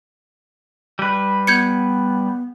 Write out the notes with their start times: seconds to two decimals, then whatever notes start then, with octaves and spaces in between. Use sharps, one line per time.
0.99 G3 B4
1.47 B3 G6 G#6 C#7